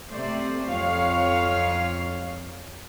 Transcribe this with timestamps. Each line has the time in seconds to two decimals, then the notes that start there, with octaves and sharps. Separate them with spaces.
0.10 C3 A3 C5 D5
0.66 F2 C#5 F5